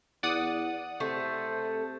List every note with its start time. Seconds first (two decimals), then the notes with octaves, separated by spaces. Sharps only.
0.23 E2 D5 F#5 D#6
1.00 C3 A3 C5